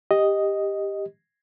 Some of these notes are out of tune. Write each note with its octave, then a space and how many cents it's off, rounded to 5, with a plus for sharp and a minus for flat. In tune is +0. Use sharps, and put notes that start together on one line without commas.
G4 +10 D#5 +0